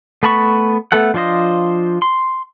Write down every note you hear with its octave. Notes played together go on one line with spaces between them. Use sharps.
A3 B3 A5 B5 C#6
A3 B3 A4 F#5
F3 D4 F4 C5 D#5
C6